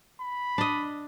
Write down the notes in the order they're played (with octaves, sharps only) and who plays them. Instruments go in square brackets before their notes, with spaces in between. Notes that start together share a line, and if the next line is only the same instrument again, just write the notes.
[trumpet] B5
[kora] D4 D#5